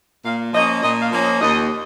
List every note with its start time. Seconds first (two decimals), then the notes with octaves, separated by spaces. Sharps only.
0.25 A#2 F5
0.54 F3 A#3 C#4 D#5
0.83 A#2 D#5
1.02 F5
1.12 F3 A#3 C#4
1.22 D#5
1.41 D#2 D#5